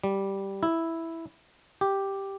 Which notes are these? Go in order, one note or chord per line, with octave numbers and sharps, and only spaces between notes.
G3
E4
G4